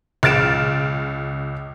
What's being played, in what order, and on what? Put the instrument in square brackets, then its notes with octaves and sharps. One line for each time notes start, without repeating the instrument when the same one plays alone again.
[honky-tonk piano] C#2 F6 A6 D7 E7